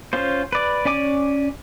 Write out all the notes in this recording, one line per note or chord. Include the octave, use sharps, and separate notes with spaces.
C#4 F4 C5
B4 D5
C#4 D5 G#5 D6